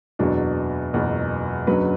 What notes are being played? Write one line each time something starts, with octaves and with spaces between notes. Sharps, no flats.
F#1 E2 B2 F#3 D4 F#4
F#1 E2 B2 F#3
F#1 F#2 D3 F#3 F#4 B4